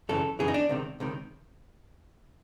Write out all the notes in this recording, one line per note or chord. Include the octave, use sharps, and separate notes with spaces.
F#2 C#3 E3 A4
F#2 C#3 E3 G#4
D#4
D4
C#2 C3 D#3
C#2 C3 D#3